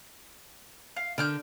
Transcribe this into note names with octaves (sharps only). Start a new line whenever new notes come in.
F5
D3 A#4 F6 G6